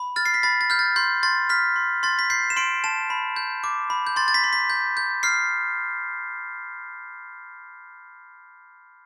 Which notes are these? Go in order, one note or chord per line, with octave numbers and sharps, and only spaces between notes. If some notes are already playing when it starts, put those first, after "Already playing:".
Already playing: B5
F6 A6
C7
B6
B5 A6
A6
F6 G6
A6
C6 G6
C6 A6
F6 B6
C6
C6 A6
B6
G6 C7
E7
C6 D7
A5 E7
B5
G6
D6
B5
G6
C6 A6
A6
B6
C6
B6
G6
G6
F6 C7